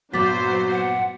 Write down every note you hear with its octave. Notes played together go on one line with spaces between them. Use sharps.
G2 A#2 F#3 B3 C5 D6 A6 B6
F#5